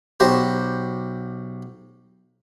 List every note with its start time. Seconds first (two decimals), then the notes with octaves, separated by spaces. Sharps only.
0.20 B1 F#4 G4 C5